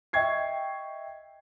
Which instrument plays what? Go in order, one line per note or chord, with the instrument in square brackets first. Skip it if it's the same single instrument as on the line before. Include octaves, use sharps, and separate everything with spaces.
[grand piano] D#5 E5 G5 C#6 G#6 C7